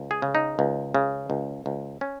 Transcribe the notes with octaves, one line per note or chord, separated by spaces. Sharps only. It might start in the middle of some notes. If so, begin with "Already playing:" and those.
Already playing: C#2
G#4
C#3
D#4
C#2
C#3
C#2
C#2
C#4